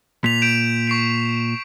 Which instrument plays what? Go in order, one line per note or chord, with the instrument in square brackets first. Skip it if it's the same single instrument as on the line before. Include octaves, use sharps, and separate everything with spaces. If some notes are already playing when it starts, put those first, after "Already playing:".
[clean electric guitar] A#2 [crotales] B6 F7
[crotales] G6 D7 E7
C#6 C7 D7